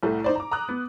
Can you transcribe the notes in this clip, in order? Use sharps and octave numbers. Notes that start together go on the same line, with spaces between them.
C2 A2 A3
D#4 C5 D5
A#5 D6
A#5 D#6 F#6
B3